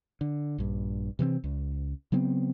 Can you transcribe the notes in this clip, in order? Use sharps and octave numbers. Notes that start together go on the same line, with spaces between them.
D3
A#1 G2
C3 E3 G3 C4
C#2
C#3 F#3 B3 C4